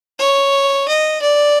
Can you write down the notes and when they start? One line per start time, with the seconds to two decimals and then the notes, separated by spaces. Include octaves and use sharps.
0.19 C#5
0.88 D#5
1.21 D5